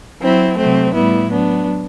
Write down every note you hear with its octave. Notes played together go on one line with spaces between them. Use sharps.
F#3 C4 E4
C3 F#3 A3 C4
A2 G3 B3 E4
F#3 B3 D4